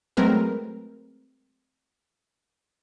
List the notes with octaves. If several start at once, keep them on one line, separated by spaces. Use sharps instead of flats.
F#3 G#3 A3 C4 A#4 B4